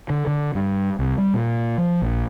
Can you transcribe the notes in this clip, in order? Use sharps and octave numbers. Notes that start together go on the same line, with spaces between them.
D3
D3
G2
C2
G3
A#2
F3
A#1